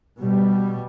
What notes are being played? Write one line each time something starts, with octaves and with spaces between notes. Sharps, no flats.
B2 G3